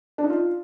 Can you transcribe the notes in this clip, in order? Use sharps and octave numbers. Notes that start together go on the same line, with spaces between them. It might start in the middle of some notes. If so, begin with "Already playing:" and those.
D4
D#4
F4